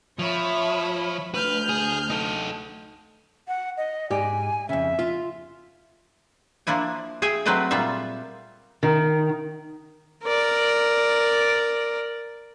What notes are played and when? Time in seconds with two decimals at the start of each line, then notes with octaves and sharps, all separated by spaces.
0.19 F3 C#5 E5 B5
1.34 D2 B4 F6 G6
1.69 G#4
2.10 D#4 A4
3.48 F#5
3.77 D#5
4.11 G#2 G4 D5 G#5
4.69 F2 C#3 E5
4.99 F4
6.67 F3 A#3 D4 E4 G#5
7.22 G#4 E5 G5 G#5
7.45 F#3 A3 C4 B4 D5 D#5
7.71 A#2 G3 F4 E5
8.83 D#3
10.24 A#4 D5